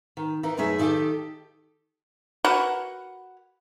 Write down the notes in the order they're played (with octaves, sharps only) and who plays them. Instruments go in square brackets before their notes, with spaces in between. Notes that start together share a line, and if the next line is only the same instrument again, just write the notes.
[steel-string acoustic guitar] D#3
E3 D#4 A#4
F#2 B2 A3 D#4 G#4 E5
D#3 D#4 E4 F#4 G4 A4
[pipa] F#4 A#4 B4 F#5